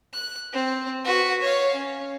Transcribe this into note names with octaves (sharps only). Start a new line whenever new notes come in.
F#6
C4
F#4 B4
C#5 F5
C#4